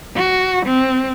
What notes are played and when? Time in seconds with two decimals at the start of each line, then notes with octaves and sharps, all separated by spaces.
0.16 F#4
0.66 C4